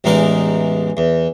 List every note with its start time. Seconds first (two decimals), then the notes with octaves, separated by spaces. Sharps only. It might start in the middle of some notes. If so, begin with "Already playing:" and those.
0.04 A1 E2 G#3 D#4 A#4 D5
0.97 E2